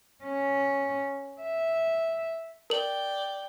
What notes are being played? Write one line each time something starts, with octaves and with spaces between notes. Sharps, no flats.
C#4
E5
A#4 D5 G5 F#7